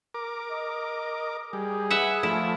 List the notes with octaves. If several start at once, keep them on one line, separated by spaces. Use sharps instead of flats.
A#4 D6
D#5
G3 G#4
B4 E5 F#5
F3 A3 E4